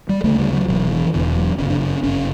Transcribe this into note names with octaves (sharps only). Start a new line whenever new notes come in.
G3
D2 C#3 A3
G3
F#3
E1 E2 B2 F#3
E3
E1 E2 B2 D3
E3
F#3
G1 F#2 C#3 C#4
D4
C#4
G1 F#2 C#3 C#4